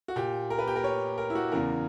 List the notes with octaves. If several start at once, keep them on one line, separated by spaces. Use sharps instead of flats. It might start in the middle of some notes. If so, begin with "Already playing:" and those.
F#4
A#2 G4
A#4
B4
G4
A#4
C#5
A#4
E4
F#4
E2 C#3 E3 A#4